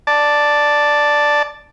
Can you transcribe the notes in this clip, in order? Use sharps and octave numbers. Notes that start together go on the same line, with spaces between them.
D5 A5